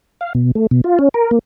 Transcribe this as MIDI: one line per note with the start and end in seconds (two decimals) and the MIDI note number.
0.21 0.33 77
0.35 0.51 47
0.55 0.67 57
0.71 0.81 47
0.84 0.99 65
0.99 1.09 61
1.14 1.31 70
1.31 1.39 58